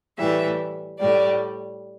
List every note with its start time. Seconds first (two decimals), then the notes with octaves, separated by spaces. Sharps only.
0.18 A2 E3 G3 E5
1.00 A2 G3 D5